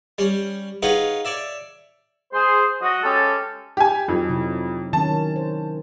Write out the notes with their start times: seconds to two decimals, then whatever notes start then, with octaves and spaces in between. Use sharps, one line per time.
0.18 G3 C#4
0.82 D#4 F4 G#4 B4 C#5 F#5
1.25 C#5 D5 E5
2.33 G#4 C5
2.82 F#4 D#5
3.03 G#3 C#4 G4 A4
3.77 G4 G#5
4.08 F2 F#3 D#4
4.29 C3 E4
4.93 D#3 F#3 C#4 A5
5.36 C5